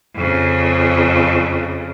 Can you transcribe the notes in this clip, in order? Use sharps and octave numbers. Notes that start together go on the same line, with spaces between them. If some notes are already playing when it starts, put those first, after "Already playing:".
F2 C#3